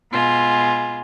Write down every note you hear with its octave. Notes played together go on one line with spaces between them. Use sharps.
B2 G#3 F4